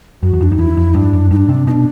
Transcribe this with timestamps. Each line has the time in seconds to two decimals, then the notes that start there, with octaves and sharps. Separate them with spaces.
0.22 F#2 F#4
0.33 E2
0.40 F2 D4
0.51 F2 D#4
0.59 E2 E4
0.77 F2
0.94 G2 D4
1.13 F#2
1.31 G2 D#4
1.36 D4
1.49 C3
1.67 B2 D4 D#4